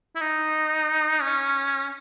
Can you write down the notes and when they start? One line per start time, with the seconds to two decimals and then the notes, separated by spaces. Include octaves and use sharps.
0.15 E4
0.21 D#4
1.22 C#4